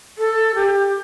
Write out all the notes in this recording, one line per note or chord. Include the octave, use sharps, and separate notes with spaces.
A4
G4